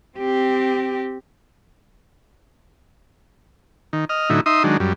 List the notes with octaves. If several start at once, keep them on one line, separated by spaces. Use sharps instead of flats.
C4 G4
D#3
D#5 F6
A2 D3 F#3 D#4 E4
D#4 E5 C6 D#6
D#3 F#3 G#3 D4
F#2 G3